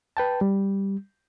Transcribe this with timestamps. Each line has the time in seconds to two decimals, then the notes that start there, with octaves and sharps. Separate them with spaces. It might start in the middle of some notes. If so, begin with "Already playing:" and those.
0.17 B4 G5 A5
0.41 G3